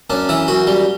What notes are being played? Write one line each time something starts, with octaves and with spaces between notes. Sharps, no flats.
F#2 D4
E3 E4
F#2 F#4
G3